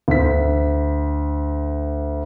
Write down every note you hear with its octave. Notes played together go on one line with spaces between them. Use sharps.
D2 B6